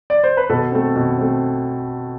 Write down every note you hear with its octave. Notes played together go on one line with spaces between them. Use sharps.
D5
C5
B4
B2 A4
A3 C4
B2
A3 C4